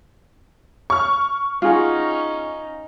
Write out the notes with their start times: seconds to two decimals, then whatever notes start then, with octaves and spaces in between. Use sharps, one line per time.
0.90 C#6 F6
1.62 C#4 D#4 F4 G#4 F#5